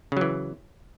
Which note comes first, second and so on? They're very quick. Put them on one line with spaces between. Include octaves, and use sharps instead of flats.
C#3 F#3 E3